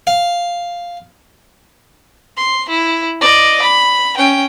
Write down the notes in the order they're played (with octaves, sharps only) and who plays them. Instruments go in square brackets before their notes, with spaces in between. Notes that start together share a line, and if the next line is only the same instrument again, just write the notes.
[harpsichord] F5
[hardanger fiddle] C6
E4
D5 D#5
B5
C#4 G5